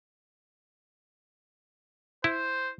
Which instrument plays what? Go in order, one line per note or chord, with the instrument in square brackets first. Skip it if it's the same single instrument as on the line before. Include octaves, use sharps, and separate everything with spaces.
[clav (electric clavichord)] E4 [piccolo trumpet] C5